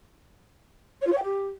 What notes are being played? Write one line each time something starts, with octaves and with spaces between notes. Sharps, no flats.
C#5
F4
C#5
G5
G4